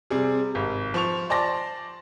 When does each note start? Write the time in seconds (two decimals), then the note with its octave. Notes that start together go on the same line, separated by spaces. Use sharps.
0.10 C3 G3 G#4
0.55 G#1
0.94 F3 C#6 F7
1.30 C5 D5 A5 C6 A#6